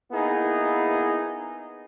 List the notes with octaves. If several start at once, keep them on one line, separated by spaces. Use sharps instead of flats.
A#3 B3 D#4 E4 G#4